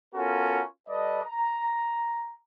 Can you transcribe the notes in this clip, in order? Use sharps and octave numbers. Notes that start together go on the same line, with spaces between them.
B3 C#4 F4 F#4 A4 A#4
G3 A4 B4 D5 D#5
A#5